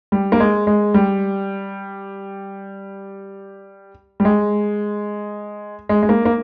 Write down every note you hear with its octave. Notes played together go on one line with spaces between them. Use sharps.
G3
A#3
G#3
G#3
G3
G3
G#3
G#3
G#3
A#3
A#3